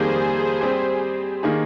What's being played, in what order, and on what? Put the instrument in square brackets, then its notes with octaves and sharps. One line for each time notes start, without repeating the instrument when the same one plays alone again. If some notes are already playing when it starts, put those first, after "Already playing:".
Already playing: [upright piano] F2 D#3 G3 A#3 [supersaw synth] G#4 C5
[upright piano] G3 C4 G4
D#3 A#3 D#4 G#4